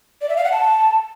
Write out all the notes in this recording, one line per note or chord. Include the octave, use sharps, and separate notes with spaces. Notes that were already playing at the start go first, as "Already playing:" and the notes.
D5
E5
F5
F#5
A5